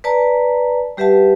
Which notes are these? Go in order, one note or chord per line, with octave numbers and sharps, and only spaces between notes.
B4 D5 A5 A#5
G3 G4 B4 E5 F#5 A5